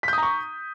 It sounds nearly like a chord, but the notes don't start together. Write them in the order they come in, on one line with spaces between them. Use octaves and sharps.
B6 G6 D#6 A#5 C#6